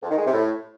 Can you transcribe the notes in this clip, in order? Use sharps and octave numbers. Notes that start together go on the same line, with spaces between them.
F2
D#3
G#3
C3
A2